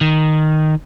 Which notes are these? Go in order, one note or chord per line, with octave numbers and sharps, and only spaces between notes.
D#3